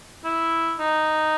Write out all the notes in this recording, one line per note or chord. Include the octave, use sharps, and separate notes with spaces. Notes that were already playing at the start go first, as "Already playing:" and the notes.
E4
D#4